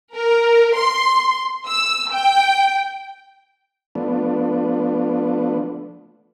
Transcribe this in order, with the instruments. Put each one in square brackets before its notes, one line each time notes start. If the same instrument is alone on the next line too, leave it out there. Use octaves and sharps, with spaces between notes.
[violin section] A#4
C6
E6
G5
[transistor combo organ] F3 A3 B3 D4